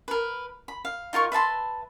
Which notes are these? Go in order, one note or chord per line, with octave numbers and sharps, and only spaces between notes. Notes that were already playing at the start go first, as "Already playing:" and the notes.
A#4 B4
B5
F5
D#4 F4 A#4 C#6
B4 E5 A5 C6